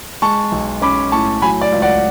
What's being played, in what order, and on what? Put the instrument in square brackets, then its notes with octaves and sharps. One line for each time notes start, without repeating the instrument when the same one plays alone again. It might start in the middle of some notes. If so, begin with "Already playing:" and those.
[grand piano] G#3 A5 C#6
B1
C#4 B5 D6
A2 A5 C#6
F#3 G#5 B5
D5
C#2
D5 F#5